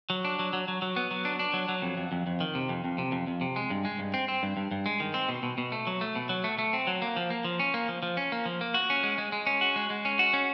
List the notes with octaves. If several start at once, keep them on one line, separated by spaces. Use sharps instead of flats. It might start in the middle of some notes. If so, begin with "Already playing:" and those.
F#3
D4
F#3
F#3
F#3
F#3
B3
F#3
D4
D4
F#3
F#3
F2
F2
F2
F2
D#3
C3
F2
F2
C3
F2
F2
C3
G#3
G2
G#3
G2
C4
C4
G2
G2
G2
G#3
D#3
C4
B2
B2
B2
A3
F#3
A3
B2
F#3
A3
A3
C4
F#3
A#3
F3
A#3
F3
C#4
A#3
F3
F3
C#4
A#3
F3
A#3
F#4
C#4
G#3
G#3
G#3
C#4
F#4
G#3
G#3
C#4
F#4
C#4